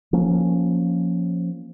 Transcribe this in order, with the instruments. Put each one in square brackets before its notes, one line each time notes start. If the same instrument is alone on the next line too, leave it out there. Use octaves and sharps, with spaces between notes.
[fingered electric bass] F3 A#3 C#4